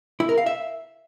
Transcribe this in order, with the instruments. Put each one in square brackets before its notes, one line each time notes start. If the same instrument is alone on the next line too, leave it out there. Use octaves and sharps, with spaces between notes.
[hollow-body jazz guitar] E4
A#4
F5
E5